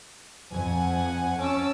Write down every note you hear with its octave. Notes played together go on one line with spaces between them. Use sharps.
F2 F#5 G#5
C#4 A5 D6 E6